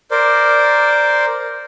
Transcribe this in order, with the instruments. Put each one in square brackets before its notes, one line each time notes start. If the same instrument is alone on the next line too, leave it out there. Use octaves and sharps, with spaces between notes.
[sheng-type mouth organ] A#4 C5 D5